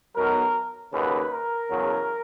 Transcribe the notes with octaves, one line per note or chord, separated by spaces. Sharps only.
B1 B2 F#3 A#4
D#2 C#3 F#3 B4
A#4
E2 C#3 F#3